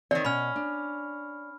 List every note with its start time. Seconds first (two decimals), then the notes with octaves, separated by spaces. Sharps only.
0.11 D#3 C4 C#5 D5
0.25 B2 C#4 B5 F6
0.56 D4